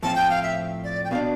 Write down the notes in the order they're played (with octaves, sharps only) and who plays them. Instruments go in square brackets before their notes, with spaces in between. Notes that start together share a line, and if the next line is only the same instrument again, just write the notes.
[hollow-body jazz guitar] A2 F3 C4 F4 [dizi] A5
[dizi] G5
F5
E5
D5
G5
[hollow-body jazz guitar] B2 B3 D4 [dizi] F5